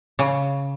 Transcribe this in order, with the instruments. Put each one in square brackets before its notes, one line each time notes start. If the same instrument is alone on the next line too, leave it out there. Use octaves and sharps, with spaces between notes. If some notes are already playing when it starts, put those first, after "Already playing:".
[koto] C#3